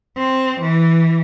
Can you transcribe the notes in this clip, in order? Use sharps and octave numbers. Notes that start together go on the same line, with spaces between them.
C4
E3